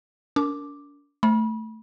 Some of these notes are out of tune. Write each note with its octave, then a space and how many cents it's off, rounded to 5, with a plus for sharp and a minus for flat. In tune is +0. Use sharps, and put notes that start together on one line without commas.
D4 -40 A#4 -10 D6 +0
A3 +5 B5 -35